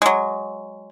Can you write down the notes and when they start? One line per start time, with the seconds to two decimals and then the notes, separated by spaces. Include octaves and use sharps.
0.02 F#3 G#3